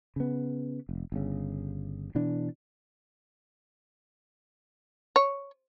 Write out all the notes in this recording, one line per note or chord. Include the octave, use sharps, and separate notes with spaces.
C#3 B3
F1
G1 C#3
B2 E3 D4
C#5